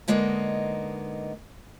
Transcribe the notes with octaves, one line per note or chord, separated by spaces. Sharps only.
D3 G#3 A#3 B3 D#4